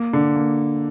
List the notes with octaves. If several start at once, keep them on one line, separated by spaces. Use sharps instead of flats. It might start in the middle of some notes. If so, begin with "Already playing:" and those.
Already playing: A#3
D3
A#3